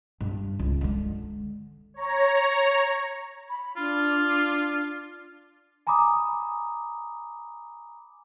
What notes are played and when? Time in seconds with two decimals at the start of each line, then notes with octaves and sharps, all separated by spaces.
0.21 G2
0.59 C#2
0.81 D3 G#3
1.94 C#5 A#5
3.49 B5
3.77 D4 F4
5.87 G#5 A#5 B5 D6 D#6